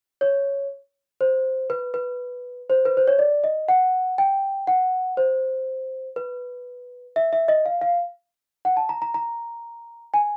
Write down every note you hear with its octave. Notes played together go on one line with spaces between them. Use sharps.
C#5
C5
B4
B4
C5
B4
C5
C#5
D5
D#5
F#5
G5
F#5
C5
B4
E5
E5
D#5
F5
F5
F#5
A5
A#5
A#5
A#5
G#5